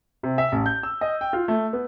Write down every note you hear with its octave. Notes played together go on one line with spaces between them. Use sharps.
C3
E5
A1
G6
E6
D#5
G5
F4
A3
B3